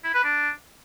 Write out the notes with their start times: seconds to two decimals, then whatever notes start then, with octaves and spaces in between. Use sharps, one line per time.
0.04 E4
0.14 B4
0.24 D4